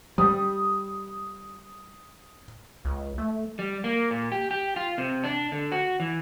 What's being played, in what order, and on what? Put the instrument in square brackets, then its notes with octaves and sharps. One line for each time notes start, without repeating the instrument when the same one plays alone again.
[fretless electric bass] G3 [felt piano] D#6
[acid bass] C#2
A3
[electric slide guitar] G3
A#3
A#2
G4
G4
F4
C3
D4
D3
F#4
E3